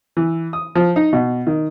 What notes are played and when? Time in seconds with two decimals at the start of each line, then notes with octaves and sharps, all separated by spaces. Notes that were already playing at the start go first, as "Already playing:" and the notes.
0.17 E3
0.53 D#6
0.75 F3
0.96 D#4
1.13 B2
1.47 D#3